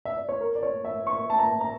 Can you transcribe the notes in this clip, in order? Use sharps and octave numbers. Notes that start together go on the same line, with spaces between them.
E5
D5
C#5
A#4
D5
C#5
E5
C#6
A5
A#5
A#5